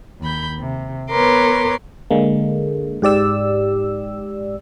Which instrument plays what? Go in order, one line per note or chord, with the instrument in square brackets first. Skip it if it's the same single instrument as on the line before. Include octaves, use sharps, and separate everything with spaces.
[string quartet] D#2 B5 G6
C3
B3 A#4 B4 C#5 C6 D6
[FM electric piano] D3 G#3 A#3
G#2 G4 D5 E6